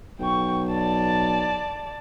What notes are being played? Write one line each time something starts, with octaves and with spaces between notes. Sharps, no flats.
B1 G5 C#6
D5 A5